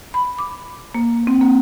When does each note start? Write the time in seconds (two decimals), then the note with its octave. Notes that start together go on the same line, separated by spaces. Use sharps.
0.14 B5
0.39 D6
0.94 A#3
1.27 C4
1.41 A#3